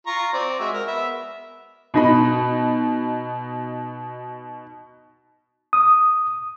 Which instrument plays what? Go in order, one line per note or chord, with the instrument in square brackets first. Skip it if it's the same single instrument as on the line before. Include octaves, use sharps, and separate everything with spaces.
[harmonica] F4 A#5 C#6
C4 D5
G#3 F#4 E5
A#4
B3 E5
[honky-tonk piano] B2 D#4 B5
[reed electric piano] D#6